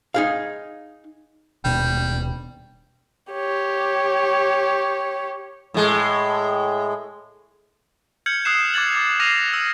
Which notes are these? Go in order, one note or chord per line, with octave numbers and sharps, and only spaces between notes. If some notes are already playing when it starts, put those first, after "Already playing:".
D#4 G#4 F5
D#1 B2 G3 D4
G4 C#5
A2 G#3
F6 G6 G#6 C#7 F#7
D#6 E6 F#6 C7 E7
D6 G#6 A6 F#7
D6
D6 F6 A#6 C7 D#7 F7
E6